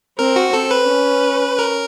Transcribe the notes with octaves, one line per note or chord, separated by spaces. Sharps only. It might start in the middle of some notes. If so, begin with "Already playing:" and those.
C4 A#4
F#4
C4 A4
B4
C#4
A#4